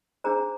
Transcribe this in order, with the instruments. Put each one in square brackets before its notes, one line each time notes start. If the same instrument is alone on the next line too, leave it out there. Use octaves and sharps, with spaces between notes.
[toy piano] D4 G#4 C5 A#5